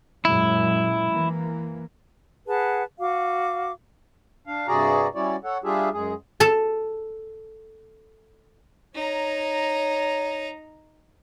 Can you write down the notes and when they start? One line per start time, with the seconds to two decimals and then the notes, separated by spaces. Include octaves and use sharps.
0.25 F#2 A#2 G#3 E4
1.14 E3 A#3
2.48 G#4 B4 F#5 A5
2.99 F#4 F5 D6
4.47 D4 F5
4.68 G2 C3 F#4 G#4 D5 A#5
5.15 G3 C#4 E4 F#4 C#5 D5
5.44 A4 C#5 F#5
5.64 G3 D4 F4 G4 G#4 E5
5.93 F#2 G#3 G#4
6.40 A4 A5
8.94 D#4 C#5 A#5